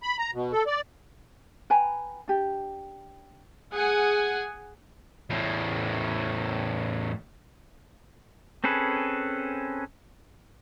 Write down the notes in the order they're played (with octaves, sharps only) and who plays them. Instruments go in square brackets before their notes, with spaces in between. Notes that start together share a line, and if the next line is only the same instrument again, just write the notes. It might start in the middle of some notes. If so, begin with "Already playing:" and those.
[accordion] B5
A#5
B2
A4
D5
[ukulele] B4 G5 G#5 A#5
D4 G4
[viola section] G#4 F#5 G#5
[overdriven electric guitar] E2 A2
[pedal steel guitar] C4 C#4 G#4 A4 B4